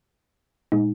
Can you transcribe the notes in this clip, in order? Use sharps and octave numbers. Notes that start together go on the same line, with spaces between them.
A#2 G#3 D#4